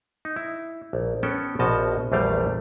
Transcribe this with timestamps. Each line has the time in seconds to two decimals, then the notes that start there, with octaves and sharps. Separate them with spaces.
0.25 D#4
0.36 E4
0.93 A#1
1.23 B3 C#4 A4 G5
1.59 A#1 B2 F3 F#4 D#5 A5
2.12 A#1 E2 G3 A3 F5 G5